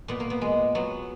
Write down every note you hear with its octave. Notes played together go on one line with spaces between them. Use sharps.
A#2 B3
A#3
B3
G#3
F#3 B3